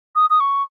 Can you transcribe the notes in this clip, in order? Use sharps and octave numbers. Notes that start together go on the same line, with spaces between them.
D#6
D#6
C#6